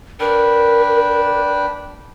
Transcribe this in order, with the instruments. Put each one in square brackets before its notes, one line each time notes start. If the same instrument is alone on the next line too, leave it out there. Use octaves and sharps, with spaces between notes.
[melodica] D4 B4 G5 [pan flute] A#4